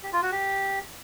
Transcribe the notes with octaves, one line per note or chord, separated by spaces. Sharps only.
G4
F4
F#4
G4